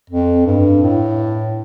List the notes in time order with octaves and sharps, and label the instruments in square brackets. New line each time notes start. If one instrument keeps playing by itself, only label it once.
[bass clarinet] F2
G2
A2